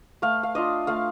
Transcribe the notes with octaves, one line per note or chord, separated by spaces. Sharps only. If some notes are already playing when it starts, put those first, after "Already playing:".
A3 F5
F5
D4 F4 D#5
A3 F5